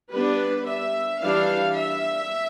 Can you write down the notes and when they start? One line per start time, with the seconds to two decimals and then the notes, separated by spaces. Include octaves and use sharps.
0.12 G3 B3 D4 B4
0.67 E5
1.22 E3 G3 D4 F5
1.76 E5